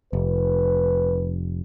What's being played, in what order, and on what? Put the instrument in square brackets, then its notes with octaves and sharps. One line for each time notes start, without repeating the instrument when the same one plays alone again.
[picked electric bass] F1 [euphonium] B4